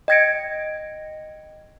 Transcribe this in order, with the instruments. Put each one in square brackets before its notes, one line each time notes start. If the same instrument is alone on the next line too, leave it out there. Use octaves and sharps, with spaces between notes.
[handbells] D#5 G5 G#6 A#6 C#7 D7